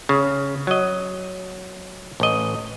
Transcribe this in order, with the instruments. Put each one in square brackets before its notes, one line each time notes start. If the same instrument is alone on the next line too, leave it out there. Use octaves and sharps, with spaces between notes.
[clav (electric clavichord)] C#3
F#3 D#5
A1 D#5